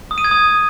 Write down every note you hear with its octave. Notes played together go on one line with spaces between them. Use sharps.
D#6
D#7
G#6
D#6